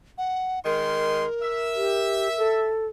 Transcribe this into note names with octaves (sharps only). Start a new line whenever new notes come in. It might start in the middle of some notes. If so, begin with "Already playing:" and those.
F#5
D#3 G#3 A#4 C6
E5
G4
A4